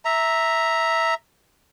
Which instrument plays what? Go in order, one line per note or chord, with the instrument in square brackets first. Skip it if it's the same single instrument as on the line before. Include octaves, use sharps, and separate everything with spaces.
[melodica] E5 A#5